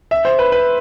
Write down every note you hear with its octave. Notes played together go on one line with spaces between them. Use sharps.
E5
C5
B4
B4